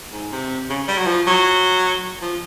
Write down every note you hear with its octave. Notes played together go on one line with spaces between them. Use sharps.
G#2
C3
C#3
G3
F#3
F3
F#3
F3